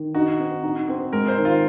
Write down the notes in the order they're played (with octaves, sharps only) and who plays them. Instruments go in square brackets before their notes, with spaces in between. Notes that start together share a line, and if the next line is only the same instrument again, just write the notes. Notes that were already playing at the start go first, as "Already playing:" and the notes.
Already playing: [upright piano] D#3
[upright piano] D#4 [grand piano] F#4
[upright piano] C4
D#4
C4
[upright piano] G#3 [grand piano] A#4
[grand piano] C5
[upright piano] D#3
[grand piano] F4